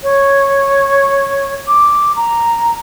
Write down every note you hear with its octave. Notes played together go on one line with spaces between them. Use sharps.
C#5
D6
A#5